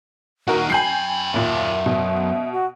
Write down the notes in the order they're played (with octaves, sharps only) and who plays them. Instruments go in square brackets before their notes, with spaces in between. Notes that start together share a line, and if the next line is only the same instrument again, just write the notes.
[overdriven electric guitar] A#2 D#3 [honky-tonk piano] F#4 A#4
[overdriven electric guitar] F#2 B5 [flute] G5 [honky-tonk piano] G#5 G6 C7
[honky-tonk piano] D#2 A#2 [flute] E5
[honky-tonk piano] B2
[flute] F#4